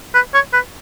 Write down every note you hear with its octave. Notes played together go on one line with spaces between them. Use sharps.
B4
C#5
B4